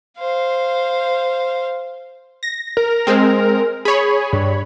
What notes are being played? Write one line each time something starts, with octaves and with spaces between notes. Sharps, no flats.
C5 F5
A#6
A#4
G#3 C4
G#4 C#5 B5
G2